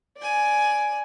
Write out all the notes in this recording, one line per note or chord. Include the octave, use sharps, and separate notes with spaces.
D5 G#5